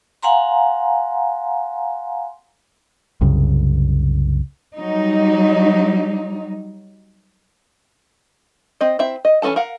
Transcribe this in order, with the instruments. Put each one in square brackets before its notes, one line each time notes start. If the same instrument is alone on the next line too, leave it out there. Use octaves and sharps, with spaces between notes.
[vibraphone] F5 F#5 G#5 A#5 C6
[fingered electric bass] C2 F#2 C#3
[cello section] F#3 G3 D#4
[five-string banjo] C4 D#5
C4 E4 E5
D#5
E3 C#4 F#4 A4 A5
A#4 F5 F#5